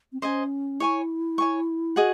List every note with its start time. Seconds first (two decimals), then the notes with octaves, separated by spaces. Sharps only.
0.13 C4
0.22 C#4 C5 D#5 G#5
0.80 E4 C#5 G#5 C#6
1.38 C#5 G#5 C#6
1.96 F#4 G#4 D#5 F#5